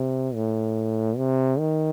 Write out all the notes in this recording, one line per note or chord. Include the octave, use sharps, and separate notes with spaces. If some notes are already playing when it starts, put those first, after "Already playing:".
Already playing: C3
A2
C3
D#3